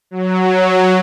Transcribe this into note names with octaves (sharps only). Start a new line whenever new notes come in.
F#3